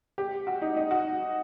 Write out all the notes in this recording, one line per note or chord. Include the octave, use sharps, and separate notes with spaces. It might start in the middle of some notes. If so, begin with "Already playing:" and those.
G4
F#4
D#4
D#4
F#4